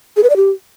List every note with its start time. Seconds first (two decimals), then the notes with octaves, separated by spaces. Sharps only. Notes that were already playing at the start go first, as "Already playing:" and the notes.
0.17 G#4
0.23 B4
0.30 D5
0.36 G4